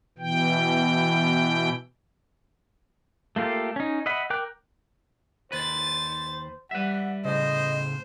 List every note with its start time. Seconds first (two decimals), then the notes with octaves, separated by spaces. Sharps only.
0.18 B2 E3 G5
3.36 A3 A#3 F4 G4 A4
3.76 C#4 D#4
4.06 D#5 E5 F#5 B5
4.30 A#4 G5 D6 F#6
5.52 D#2 B4 C5 A6
6.71 G3 B4 E5 F#5
7.25 A2 C#3 C5 D#5